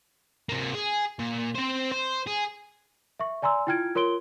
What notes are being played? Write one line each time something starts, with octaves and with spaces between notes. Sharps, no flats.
C3 A#3
G#4
A#2
C4 C5
C5
G#4
E5 C#6
D5 G#5 A#5 C6 E6
E4 F4 G5 F6 G#6 D7
F4 A#4 C#5 C6 D7 G7